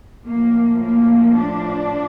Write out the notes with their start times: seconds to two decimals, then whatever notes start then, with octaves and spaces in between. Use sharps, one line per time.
0.25 A2 F3 A#3
0.81 A#3
1.37 D4